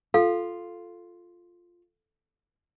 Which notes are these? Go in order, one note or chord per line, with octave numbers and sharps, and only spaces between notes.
F4 A4 F5